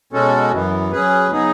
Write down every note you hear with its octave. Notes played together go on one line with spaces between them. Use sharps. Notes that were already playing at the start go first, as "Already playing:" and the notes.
B2 G#3 C#4 F#4 A4
F#2 E3 B3
F#3 C#4 G#4 B4
C#3 F#3 B3 D#4 G#4